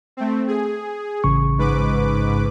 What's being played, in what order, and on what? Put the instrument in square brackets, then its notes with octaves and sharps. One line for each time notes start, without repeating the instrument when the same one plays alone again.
[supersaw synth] A3 C4
G#4
[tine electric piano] A1 C#3 C#6
[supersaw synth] G#2 B4 D6